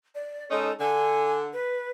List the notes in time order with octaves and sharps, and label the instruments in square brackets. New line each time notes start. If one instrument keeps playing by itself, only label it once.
[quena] D5
[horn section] G#3 C#4 D#4 [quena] A4
[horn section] D3 [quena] G#5
[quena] B4